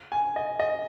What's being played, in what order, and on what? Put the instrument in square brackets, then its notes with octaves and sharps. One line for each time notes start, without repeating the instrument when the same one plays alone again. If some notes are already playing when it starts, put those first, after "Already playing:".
[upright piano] G#5
D#5
D#5